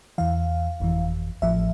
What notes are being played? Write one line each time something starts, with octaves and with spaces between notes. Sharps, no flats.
E2 E3 F5
G1 F2 E3
A1 A2 F3 E5